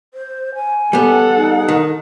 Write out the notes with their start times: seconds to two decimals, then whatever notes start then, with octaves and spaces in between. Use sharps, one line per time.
0.14 C5
0.55 G#5
0.93 G3 B3 A4 F#5
1.35 D#4
1.68 D#3